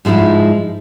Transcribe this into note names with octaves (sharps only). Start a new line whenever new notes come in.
G#2 F3 G#3 D#4 E4